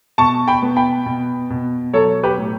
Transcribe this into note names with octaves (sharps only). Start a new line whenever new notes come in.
B2 A5 C#6
G5 B5
B3
G5 B5
B2
B2
F#3 A4 C#5
G4 B4
A2